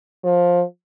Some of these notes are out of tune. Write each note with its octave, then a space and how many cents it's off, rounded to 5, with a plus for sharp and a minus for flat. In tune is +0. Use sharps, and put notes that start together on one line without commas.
F3 +15